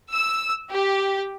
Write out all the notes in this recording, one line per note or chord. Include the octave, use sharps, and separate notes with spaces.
E6
G4